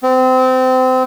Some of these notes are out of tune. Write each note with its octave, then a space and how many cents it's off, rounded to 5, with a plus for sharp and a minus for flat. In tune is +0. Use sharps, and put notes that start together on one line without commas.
C4 -25